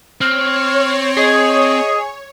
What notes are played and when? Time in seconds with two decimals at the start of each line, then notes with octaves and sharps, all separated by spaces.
0.21 C4 C#5 F6
1.17 G#4 D#5